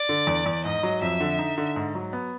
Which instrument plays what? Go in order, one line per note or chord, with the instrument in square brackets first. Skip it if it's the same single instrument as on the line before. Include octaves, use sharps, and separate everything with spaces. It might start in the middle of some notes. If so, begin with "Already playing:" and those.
Already playing: [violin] D5
[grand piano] D3
E2
E2
[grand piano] G#2 [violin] D#5
[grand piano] F#3
[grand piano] F2 [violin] E5
[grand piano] D3
D#4
D3
G#2
F#3
B3